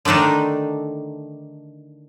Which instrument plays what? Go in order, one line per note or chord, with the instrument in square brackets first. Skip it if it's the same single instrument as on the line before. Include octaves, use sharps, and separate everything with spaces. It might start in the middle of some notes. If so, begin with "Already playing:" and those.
[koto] D3 D#3 A3 D4 D#4